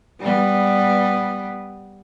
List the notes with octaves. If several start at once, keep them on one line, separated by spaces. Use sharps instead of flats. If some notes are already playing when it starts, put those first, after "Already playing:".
G3 B3